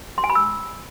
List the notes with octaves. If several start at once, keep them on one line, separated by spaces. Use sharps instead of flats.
C6
G#5
B5
E6